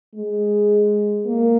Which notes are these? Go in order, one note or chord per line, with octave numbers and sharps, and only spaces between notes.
G#3
A#3